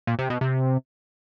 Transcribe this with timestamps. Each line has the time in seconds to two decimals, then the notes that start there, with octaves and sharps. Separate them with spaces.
0.07 A#2
0.19 C3
0.30 B2
0.41 C3